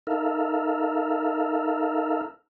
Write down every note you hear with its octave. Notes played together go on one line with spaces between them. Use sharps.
D#4 A4 A#4 E5 F5